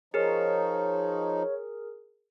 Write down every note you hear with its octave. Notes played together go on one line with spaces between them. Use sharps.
F3 D#4 G#4 A#4 C#5